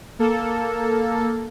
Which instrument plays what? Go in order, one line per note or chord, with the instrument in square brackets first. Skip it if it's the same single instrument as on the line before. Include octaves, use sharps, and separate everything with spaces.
[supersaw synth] A#3 A4